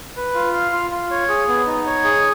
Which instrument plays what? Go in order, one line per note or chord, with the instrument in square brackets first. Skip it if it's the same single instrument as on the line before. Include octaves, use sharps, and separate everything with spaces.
[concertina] B4
F4
F5
F4
F4
C#5
G#4
B3
D#4
C#5
G#4